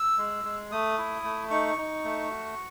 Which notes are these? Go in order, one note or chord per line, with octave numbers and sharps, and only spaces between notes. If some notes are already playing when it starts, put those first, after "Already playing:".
Already playing: E6
G#3
G#3
A3 D#6
E4
A3
D#4 C#6
D#4
A3
F#4